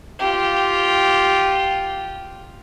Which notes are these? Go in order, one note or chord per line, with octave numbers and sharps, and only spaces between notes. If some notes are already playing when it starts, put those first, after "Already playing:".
F4 G4